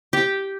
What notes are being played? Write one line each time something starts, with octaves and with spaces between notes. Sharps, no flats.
G4